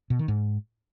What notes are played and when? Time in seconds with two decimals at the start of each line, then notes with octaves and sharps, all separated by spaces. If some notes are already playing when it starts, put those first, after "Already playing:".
0.10 B2
0.19 D#3
0.28 G#2